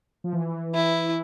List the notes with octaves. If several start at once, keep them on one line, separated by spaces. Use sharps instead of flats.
F3
E3
E4